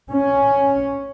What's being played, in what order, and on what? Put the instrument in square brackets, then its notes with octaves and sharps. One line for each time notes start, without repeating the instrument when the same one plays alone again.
[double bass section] C#4